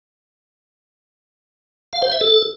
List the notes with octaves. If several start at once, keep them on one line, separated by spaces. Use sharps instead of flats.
F5
C5
E5
A4